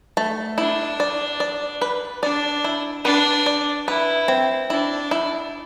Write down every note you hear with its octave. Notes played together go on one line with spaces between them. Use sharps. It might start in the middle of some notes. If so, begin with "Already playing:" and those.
A3
D4 E4
D5
D5
B4
D4 D5
E4
D4 B4
D5
E4 B4
C4
D4 E4
E4